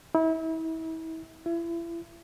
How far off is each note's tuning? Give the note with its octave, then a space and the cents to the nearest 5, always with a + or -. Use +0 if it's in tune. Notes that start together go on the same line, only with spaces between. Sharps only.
E4 -35
E4 +35